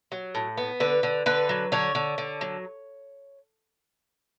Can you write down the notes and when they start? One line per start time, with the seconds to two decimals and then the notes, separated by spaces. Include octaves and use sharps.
0.12 F#3
0.35 A2
0.57 B3
0.80 D3 B4
1.03 D3
1.26 D3 B4
1.49 F#3
1.72 D3 C#5
1.95 D3
2.18 D3
2.41 F#3